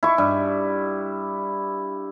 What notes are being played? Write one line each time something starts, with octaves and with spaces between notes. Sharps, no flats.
E4 C#6
G2